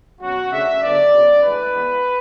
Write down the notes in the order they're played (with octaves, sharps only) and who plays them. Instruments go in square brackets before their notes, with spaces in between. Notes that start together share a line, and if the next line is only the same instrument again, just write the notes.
[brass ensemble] B2 F#3 C#4 F#4
C#3 F#3 A3 D4 E5
D3 F#3 B3 D4 D5
C#3 F#3 B3
A2 E3 G#3 D4 B4
E3 G#3 B3